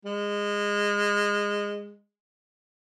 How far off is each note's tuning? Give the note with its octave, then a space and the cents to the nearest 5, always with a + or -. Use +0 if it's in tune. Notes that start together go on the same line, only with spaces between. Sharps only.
G#3 -20